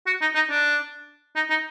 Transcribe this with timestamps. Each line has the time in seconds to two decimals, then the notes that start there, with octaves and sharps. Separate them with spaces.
0.07 F#4
0.21 D#4
0.35 D#4
0.50 D4
1.36 D#4
1.50 D#4